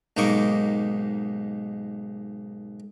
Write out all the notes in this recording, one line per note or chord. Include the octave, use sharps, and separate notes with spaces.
B1 G#2 A#3 D#4 C#6 D6